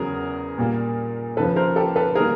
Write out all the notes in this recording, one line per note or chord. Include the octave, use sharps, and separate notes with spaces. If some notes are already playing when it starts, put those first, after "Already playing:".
Already playing: E2 C#3 F#3 G#4 A#4
A#2 G3 A#3
D#2 C#3 F3 A4 B4
A#4 C5
G4 A4
A4 B4
D#3 G3 A#3 G#4 A#4